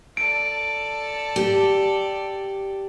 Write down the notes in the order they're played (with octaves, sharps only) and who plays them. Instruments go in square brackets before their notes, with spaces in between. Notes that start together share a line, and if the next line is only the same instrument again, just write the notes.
[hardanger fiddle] A4 D5 [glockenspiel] D7
[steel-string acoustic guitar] G4